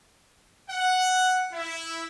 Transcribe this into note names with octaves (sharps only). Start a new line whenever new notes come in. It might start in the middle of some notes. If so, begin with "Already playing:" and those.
F#5
E4